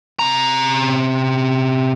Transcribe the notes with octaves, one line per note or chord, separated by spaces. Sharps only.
C3 A#5